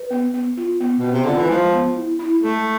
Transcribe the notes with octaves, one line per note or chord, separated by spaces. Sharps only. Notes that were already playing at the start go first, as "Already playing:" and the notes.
Already playing: B4
B3
B3
F4
B3
B2
B3
C3
D3 F4
E3
F3 G#3
B3
E4
E4
G#3 A3